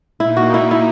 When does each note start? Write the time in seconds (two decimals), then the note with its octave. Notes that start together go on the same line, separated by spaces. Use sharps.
0.19 A#2 A#3 D#4 E4
0.37 F#4
0.54 E4
0.71 E4